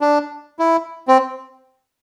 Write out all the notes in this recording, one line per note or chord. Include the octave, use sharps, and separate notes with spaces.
D4
E4
C4